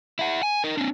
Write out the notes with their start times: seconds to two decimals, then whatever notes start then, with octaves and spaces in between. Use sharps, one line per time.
0.19 E4 F#5
0.43 G#5
0.64 D#4 A#4
0.77 C4 D4